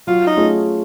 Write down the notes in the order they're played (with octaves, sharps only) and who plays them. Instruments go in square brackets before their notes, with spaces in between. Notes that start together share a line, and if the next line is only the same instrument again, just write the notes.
[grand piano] F#3 [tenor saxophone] F4
[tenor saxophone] D#4
[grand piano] A3 C#4 F4 G#4